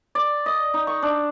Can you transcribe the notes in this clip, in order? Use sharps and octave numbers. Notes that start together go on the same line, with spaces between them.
D5
D#5
D#4
C#6
D4